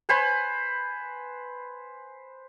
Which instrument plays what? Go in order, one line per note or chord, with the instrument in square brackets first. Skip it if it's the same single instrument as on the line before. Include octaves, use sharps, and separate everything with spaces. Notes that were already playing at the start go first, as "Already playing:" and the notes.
[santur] B4 C5 G#5 B5